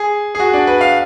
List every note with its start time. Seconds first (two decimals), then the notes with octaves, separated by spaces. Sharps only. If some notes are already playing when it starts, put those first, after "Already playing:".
Already playing: G#4
0.35 G#4
0.40 F#4
0.53 D4
0.67 B4
0.81 F5